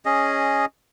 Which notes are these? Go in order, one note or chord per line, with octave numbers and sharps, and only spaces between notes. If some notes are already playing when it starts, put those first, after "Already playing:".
C#4 G#4 D#5